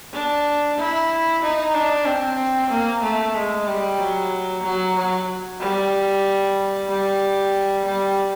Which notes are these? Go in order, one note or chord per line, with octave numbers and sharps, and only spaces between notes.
D4
E4
D#4
D4
C4
A#3
A3
G#3
G3
F#3
F#3
F#3
G3
G3
G3